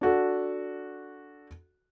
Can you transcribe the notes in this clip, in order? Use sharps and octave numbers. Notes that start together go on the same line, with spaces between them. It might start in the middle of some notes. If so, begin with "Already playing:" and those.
D4 F#4 A4